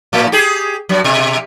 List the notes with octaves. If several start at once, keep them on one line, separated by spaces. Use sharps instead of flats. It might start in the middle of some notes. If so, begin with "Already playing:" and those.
A2 A#3
G4 G#4
G2 F#3
B2